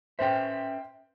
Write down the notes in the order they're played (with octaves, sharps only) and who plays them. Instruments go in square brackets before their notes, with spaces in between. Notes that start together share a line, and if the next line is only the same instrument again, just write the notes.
[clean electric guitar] C#4 B4 E5 [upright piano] C5 G5